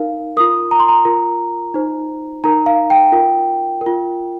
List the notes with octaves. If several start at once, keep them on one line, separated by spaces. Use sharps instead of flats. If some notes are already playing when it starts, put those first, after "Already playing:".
Already playing: D#4 A#4 F5
F4 A#4 D#6
A#5
C6
A#5
F4 A#4
D#4 C5
D#4 A#4 A#5
F5
G5
F4 A#4
A#4
F4